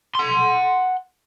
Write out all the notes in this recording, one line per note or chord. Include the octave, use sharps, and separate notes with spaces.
F#5 C6